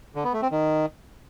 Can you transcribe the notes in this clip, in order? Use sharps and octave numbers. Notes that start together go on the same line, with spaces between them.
D3
B3
A3
C4
D#3